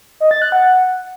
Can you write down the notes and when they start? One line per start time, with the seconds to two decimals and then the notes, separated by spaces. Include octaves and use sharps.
0.20 D#5
0.31 A6
0.42 F#6
0.52 F#5